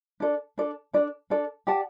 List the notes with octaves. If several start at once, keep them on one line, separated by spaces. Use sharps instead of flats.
D4 A4 D5
D4 A4 D5
D4 A4 D5
D4 A4 D5
G4 D5 F#5 A5